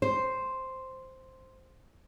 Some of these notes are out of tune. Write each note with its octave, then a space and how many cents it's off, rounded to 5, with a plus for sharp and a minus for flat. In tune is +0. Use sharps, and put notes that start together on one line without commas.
C5 +0